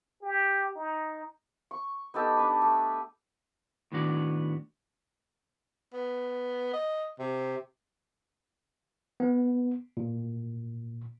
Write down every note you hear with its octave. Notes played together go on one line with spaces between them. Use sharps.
G4
D#4
C#6
B3 D#4 G4 A4
D4 B4
A3
A2 D#3 B3 D4 F#4 D5
B3
D#5
C3
B3
A#2